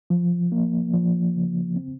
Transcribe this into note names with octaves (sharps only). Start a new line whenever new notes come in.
F3
A#3
F3
C#3
C4